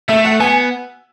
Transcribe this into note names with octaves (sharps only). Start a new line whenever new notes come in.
A3 E5
F#5
B3 G#5